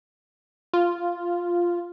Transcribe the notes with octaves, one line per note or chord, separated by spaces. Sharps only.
F4